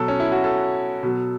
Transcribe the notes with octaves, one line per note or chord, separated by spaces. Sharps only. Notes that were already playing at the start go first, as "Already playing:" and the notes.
Already playing: B2 F#3 A4
C#4
E4
F#4
A4
B2 F#3